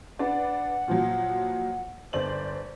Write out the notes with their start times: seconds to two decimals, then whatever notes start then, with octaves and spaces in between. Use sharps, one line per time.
0.19 D4 B4 D5 F#5
0.88 A#2 F3 F#3
2.13 G1 C5 D5 F#7